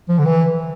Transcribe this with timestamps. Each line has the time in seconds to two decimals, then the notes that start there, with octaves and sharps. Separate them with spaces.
0.09 F3
0.19 D3
0.26 E3